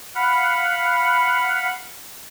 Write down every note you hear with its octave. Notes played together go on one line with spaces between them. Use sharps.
F5 F#5 B5